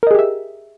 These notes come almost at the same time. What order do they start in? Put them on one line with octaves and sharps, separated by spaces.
A#4 D#5 G#4 G4 E5